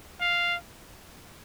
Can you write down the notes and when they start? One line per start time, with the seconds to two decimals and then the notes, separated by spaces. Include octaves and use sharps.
0.21 F5